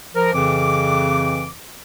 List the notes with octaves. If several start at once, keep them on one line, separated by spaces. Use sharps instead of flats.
F3 A#4
F2 C#3 E3 D6